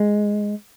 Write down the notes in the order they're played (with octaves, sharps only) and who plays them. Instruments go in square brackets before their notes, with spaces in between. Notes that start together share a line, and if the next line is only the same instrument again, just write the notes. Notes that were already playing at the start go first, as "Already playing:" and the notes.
Already playing: [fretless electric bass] G#3